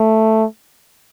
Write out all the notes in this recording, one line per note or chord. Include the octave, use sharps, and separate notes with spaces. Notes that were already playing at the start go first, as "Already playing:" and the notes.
Already playing: A3